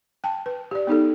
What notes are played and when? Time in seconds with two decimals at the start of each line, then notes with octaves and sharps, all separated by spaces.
0.24 G5 A5
0.46 B4
0.71 G4 D5
0.87 B3 D#4 G4 A4